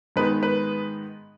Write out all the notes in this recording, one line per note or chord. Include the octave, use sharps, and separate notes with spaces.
G#2 D#3 G#3 B3 D#4 B4
B4